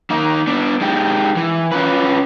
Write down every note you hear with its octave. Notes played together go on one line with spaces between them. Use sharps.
D#3 A#3 D#4
B3 D4
G#3 D#4 G4
E3
C#4 F4 B4